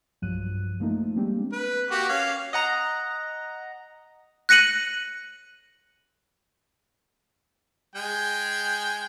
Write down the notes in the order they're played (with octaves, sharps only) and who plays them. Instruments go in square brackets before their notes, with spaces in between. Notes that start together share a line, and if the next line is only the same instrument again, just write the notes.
[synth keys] B1 G2 F3 F#3 F#6 D#7
F3 A3 A#3 D#4
G3 G#3 A#3 C4 D4 G4
[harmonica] B4
A#3 F#4 G4
C#4 F5
[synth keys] D#5 F#5 A#5
[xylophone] F#6 A#6 C#7 D#7 F#7
[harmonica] G#3 G5 G#5